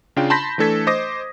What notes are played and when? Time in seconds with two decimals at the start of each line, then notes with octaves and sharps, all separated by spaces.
0.16 C#3 D4 F4 G5
0.30 A5 B5 C6 G6 A#6 B6
0.58 E3 A3 D4 A4 G#6 B6
0.87 C5 D#5 D6 D#6 A#6